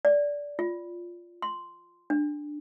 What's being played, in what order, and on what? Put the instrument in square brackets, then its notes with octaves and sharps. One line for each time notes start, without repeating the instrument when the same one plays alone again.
[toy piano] D5
F4
C6
D4